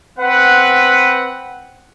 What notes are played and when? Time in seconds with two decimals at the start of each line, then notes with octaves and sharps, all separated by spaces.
0.18 C4 B4 F#5